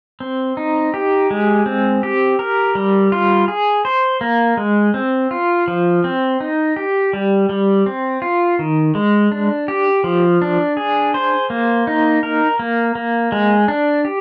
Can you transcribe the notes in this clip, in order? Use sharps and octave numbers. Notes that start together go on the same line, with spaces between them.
C4
D#4
G4
G#3
C4
G4
A#4
G3
F4
G#4
C5
A#3
G#3
C4
F4
F3
C4
D#4
G4
G3
G3
C4
F4
D#3
G#3
D4
G4
F3
D4
G#4
C5
A#3
D#4
A#4
A#3
A#3
G#3
D4
G4